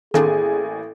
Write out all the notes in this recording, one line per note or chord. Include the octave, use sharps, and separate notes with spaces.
A1 D#3 A#3 C4 D4 G#4 A4 G#5